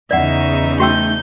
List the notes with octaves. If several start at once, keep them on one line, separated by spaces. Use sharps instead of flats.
E2 C#3 D#4 D5 E5 F#5
A3 F#4 G5 E6 G6